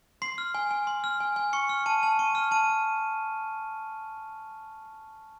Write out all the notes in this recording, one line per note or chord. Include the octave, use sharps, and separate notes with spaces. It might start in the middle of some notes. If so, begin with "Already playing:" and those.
C6 C7
F6
G#5
G#5
C6
F6
G#5
G#5
C#6 C#7
F6
A5 D#7
A5
C#6 D#7
F6
A5 D#7